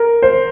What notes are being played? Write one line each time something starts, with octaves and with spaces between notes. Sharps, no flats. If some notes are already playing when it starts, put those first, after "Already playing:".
Already playing: A#4
C5